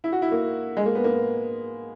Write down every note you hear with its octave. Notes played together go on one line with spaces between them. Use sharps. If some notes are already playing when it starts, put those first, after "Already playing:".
E4
F#4
E4
A#3
G#3
A#3
B3
A#3